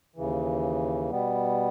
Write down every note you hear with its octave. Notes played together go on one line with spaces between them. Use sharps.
D#2 C#3 E3
B2 G3 B3